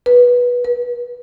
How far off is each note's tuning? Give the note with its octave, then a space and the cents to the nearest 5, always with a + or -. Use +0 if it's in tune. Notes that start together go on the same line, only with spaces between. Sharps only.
B4 -15
B4 -45